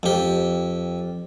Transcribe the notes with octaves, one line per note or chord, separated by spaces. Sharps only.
F2 G4